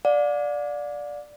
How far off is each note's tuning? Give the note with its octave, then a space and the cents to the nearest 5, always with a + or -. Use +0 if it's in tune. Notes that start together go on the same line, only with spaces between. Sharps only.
D5 +0 F5 +45